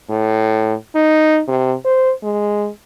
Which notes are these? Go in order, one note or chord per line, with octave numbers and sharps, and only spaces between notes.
A2
D#4
C3
C5
G#3